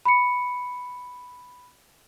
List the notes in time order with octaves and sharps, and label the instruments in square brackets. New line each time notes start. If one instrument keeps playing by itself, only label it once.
[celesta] B5 C#7